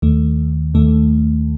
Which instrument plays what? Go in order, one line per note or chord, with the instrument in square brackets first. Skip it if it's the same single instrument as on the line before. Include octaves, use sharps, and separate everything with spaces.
[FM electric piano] D#2 D#3 A3
D#2 D#3 A3